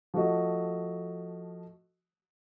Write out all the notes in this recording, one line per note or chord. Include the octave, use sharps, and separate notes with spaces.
F3 A3 F#4 D#5